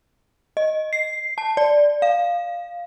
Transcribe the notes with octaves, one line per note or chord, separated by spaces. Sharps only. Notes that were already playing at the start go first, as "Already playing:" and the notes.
D#5
C7
A5
D5
F5